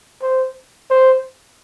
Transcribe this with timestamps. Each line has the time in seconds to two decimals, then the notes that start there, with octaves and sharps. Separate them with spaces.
0.22 C5
0.90 C5